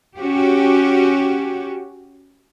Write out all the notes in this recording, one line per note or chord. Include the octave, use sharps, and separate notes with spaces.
C#4 F#4 G4